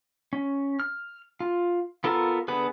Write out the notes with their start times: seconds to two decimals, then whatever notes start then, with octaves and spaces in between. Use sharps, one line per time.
0.33 C#4
0.80 F6
1.40 F4
2.04 B3 F4 A4 A#4
2.48 D3 B3 G#4 B4